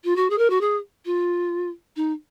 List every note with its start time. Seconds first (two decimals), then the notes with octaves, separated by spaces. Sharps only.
0.04 F4
0.16 F#4
0.30 G#4
0.38 A#4
0.50 F#4
0.61 G#4
1.06 F4
1.96 D#4